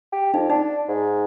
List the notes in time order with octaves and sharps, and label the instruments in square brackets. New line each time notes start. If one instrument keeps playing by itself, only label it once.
[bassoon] G4
[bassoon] F2 [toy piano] D#4
[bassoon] D4 [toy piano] D#4
[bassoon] G#2